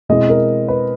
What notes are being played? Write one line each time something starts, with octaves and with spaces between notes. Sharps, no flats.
B2 G#3 C4 E4 D#5
A#4
B4